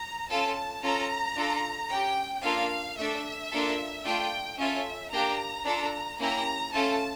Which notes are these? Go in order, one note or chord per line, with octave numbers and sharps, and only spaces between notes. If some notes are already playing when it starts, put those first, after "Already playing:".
Already playing: A#5
C#4 F4 A4 A5
C#4 F4 A4 A#5
D4 F4 A4
C#4 G4 G5
A#3 D4 F4 A4 F5
A3 D4 A4 E5
A#3 D4 F4 A4
A3 D4 F4 G5
C#4 F4 A4 E5
A#3 D4 G4 A#5
D4 F4 A4
A#3 C#4 E4 G4 A#5
A3 C#4 F4 A4 A5